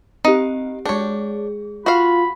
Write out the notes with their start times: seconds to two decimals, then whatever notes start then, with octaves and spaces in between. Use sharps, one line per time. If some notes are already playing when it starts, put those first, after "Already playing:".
0.25 C4 D#4 G4
0.86 G#3 D4 G#4 C#5
1.86 F4 F#4 F5 B5